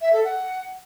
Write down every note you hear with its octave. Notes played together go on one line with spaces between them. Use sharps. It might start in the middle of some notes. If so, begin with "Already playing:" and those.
E5
A4
F#5